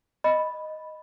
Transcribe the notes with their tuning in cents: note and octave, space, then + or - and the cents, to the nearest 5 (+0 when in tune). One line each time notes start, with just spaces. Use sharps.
D#5 +0 B5 +0